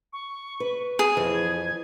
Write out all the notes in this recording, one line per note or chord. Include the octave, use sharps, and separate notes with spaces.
C#6
B4
G#4 D#7
F2 E3
G#6